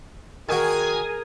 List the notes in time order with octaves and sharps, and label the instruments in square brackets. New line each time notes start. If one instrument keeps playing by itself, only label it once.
[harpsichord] D#3 F#4 [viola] G#4 A#4 [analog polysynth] G#5 D#6 G#6